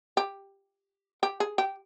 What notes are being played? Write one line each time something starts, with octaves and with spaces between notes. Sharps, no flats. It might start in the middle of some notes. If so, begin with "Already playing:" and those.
G4
G4
G#4
G4